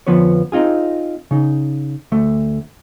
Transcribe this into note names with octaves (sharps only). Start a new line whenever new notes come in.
F2 D3 F3 B3 B4 C#5
C4 D#4 F4 G#4
C#3 D#4
D2 A3